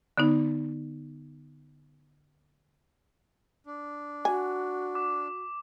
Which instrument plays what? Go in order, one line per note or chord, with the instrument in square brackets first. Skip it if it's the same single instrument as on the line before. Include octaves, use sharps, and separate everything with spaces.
[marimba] D3 B3 D#4
[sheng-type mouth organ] D4
[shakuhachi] F#4 [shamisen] G#5
[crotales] D6